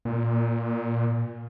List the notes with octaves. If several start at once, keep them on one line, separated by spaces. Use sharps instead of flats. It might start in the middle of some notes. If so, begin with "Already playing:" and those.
A#2